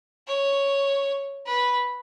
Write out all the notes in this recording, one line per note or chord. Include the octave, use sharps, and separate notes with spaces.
C#5
B4